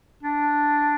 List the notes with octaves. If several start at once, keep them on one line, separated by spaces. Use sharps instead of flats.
D4